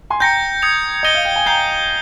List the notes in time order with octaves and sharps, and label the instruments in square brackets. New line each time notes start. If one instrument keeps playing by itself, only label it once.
[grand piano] G#5 C6
[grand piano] G5 A#5 [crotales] G6 A#6 C#7
[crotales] D#6 G#6 C#7 F7
[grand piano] D#5 [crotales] D#6 A#6 D#7 G7
[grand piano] F5
G5
G#5
[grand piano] G5 A#5 [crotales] G6 C7 G7